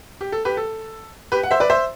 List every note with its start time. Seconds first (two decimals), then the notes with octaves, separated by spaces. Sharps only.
0.21 G4
0.32 A4
0.45 G4 B4
0.57 A4
1.32 G4 B4
1.43 F#5
1.51 C5 E5
1.60 B4 D5
1.70 C5 E5